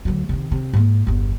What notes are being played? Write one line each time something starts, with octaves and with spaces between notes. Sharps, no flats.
D2 F#3
C3 D#3
C3
G#2 A#3
G1 E2